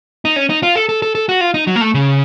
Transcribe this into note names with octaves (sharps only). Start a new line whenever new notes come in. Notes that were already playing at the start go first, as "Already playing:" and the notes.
D#4
C#4
D#4
F4
A4
A4
A4
A4
F#4
F4
D#4
F#3
A#3
A3
C#3